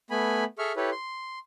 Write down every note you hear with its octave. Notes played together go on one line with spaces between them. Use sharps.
A3 B3 G#5 B5
G#4 A4 E5 C#6 F6
E4 G4 A4 B4 C#5
C6